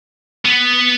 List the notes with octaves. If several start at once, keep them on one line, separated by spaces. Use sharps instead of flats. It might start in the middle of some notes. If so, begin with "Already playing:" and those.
B3